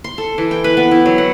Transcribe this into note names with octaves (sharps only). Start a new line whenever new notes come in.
C6
A4
E3
G5
B4
B3
E4
F#3
F#5